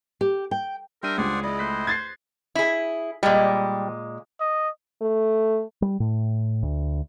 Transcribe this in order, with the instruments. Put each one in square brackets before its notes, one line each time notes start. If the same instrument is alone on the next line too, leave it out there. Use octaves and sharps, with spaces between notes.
[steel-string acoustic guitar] G4
G5
[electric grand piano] G3 D4 D#7 [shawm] A#4 [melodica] E5 G5 C6
[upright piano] C#2 [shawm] G#4 [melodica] C5 D5 F#5
[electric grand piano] G#3 D5 [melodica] E4 D#5
[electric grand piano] A3 F#6 B6 [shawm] C5
[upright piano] G#6 A6 C7
[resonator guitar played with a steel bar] E4 G#4
[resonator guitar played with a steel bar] A#2 G#3 [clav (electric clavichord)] G3
[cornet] D#5
[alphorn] A3
[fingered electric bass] G3
A2
D2